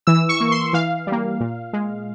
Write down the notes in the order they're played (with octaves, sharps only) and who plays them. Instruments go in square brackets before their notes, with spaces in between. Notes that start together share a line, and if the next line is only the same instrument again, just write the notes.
[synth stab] E3 E6
C#6
A#3
C6
E3 F5
G3
A#3
A#2
G#3